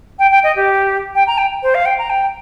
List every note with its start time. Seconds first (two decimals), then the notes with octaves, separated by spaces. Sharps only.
0.19 G5
0.31 G5
0.43 D#5
0.56 G4
1.15 G5
1.27 A#5
1.38 G5
1.63 C5
1.74 F5
1.85 G5
1.98 A#5
2.10 G5